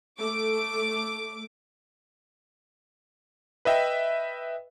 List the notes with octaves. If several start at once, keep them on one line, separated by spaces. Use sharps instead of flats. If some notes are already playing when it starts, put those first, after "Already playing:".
A3 D6
B4 D#5 E5 G5